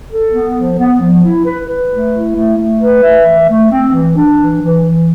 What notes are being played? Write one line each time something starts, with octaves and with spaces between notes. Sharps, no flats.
A4
B3
F3
B3
F3
E4
B4
B4
A3
E4
A3
A3
B4
E5
E3
A3
C4
E3
D4
E3
E3
E3